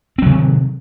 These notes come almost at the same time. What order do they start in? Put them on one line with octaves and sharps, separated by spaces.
C4 F#3 C3 D#3